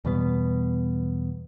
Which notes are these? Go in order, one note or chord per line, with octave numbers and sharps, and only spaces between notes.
E2 B2 G3 B3